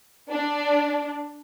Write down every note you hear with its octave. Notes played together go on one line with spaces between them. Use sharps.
D4